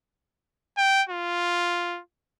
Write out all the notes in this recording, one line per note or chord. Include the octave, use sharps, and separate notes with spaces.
G5
F4